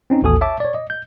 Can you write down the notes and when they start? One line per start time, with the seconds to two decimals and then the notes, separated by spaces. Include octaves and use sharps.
0.10 C4 C#4 D#4
0.23 A1 D#2 F#4 A4 G#5 D#6
0.41 C#5 E5 A5 D6
0.60 C#5 D5
0.74 D#5
0.90 G6